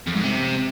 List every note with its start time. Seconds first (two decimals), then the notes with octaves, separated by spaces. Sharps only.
0.07 F2
0.15 G#2
0.24 C3